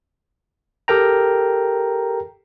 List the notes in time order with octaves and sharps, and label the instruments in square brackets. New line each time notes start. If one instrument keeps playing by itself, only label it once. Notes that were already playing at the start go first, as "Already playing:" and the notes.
[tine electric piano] G4 A4 A#4 G5 A#5